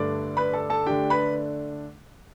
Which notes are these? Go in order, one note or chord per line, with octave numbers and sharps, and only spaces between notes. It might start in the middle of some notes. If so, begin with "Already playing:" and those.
Already playing: G2 D3 A3 D4 D5 D6
B4 B5
A4 A5
A4 A5
D3 A3 D4 G4 G5
B4 B5